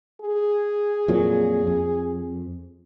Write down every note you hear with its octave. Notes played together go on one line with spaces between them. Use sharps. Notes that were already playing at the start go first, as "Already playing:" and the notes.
G#4
F2 A#2 F#3
F2